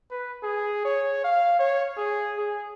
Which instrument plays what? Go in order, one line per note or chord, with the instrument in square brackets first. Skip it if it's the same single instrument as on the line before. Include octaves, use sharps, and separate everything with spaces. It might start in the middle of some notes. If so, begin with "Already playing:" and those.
[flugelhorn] B4
G#4
C#5
F5
C#5
G#4
G#4